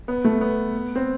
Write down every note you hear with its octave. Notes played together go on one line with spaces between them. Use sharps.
B3
A3
B3
C4